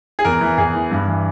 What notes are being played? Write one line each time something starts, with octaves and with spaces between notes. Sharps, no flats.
G#4
E2 A#4
E3
E2 G#4
E3
G2
E3